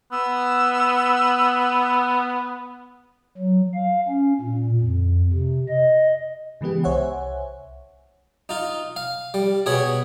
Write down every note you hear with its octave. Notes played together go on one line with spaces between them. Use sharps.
B3 E6
F#3
F5
C#4
A#2
F2
C3
D#5
C#3 E3 G#3 B3 G4
C2 C5 C#5 E5 F#5 G#5
D#4 F4
F5
G3
B2 G#4 C#5 B5